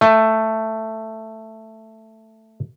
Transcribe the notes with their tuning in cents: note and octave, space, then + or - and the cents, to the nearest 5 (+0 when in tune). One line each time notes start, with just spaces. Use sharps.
A3 +5